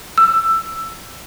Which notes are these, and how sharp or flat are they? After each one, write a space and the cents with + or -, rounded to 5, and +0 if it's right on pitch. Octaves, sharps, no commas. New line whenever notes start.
E6 +10